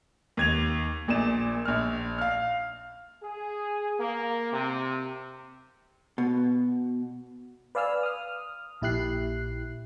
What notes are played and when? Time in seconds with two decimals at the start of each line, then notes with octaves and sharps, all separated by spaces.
0.37 D#2 G#6 F7
1.08 A#1 A#2 D5 E7
1.65 A#1 F6
2.18 F5 F6
3.22 G#4
3.99 A#3
4.51 C3
6.18 B2
7.75 B4 D5 F5 G#5 E6 F6
8.03 D#6 F6
8.81 A#1 A#2 E4 G4 F#6 C7